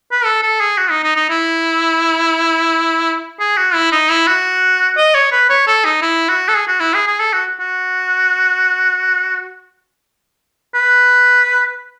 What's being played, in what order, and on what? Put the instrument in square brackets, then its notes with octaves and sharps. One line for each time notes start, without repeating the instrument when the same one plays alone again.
[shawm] B4
A4
A4
G#4
F#4
D#4
D#4
D#4
E4
G#4
F#4
E4
D#4
E4
F#4
D#5
C#5
B4
C#5
A4
D#4
E4
F#4
A4
G#4
F#4
E4
G#4
G#4
A4
F#4
F#4
B4